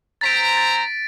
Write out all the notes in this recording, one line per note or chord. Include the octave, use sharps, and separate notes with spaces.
C4 C5 A#5 A6 B6 D7
A6